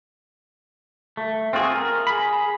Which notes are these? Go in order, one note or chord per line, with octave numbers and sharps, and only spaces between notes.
A3
C4 F4 F#4 G#4
A#4
G#4 B5